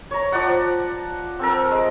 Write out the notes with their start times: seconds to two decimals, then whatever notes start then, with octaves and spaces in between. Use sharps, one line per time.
0.11 C#5 A#5
0.32 F3 D5 F#5
1.39 C4 A4 A#4
1.71 G#3